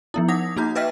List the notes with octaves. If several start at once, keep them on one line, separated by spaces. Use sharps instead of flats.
F3 B3 E4
D#4 F#5 D#6 A#6
A#3 D#4 F#4 A#5 G6
B4 D#5 E5 G5 F6 B6